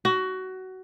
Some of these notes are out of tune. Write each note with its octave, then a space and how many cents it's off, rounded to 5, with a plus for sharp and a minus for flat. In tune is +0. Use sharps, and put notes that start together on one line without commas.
F#4 +20